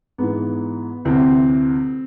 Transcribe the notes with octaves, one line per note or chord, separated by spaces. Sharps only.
G#2 E3 B3
D2 C3 E3 C4